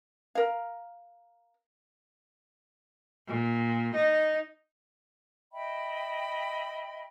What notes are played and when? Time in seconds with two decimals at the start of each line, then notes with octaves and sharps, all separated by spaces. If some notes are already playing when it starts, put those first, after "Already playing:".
0.35 A#4 F5
3.28 A#2
3.95 D#4
5.52 D#5 E5 G5 B5